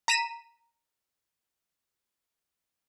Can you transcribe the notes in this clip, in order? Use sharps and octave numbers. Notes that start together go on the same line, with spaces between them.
A#5 B6 D#7 E7